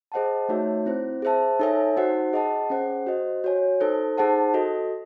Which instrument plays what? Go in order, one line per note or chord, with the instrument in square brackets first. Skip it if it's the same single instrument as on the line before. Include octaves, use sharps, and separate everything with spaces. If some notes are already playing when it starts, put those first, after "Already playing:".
[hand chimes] G#4 C5 D#5 F#5 A5
A3 D#4 F#4 C#5 E5
C4 E4 C5
G#4 C5 E5 A5
D#4 A4 C#5 E5 G#5
D#4 F#4 C5 F#5
G#4 D#5 F#5 A5
C#4 G#4 C5 F#5
F#4 C5 D#5
F#4 C#5 G#5
D#4 A4 C5
D#4 G#4 C5 F#5 A5
F#4 A4 D#5